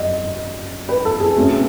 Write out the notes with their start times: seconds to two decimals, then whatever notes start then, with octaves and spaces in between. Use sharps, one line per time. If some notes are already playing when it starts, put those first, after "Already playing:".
Already playing: F#2 D#5
0.89 B4
1.05 A4
1.20 G#4
1.36 B2 A3 C#4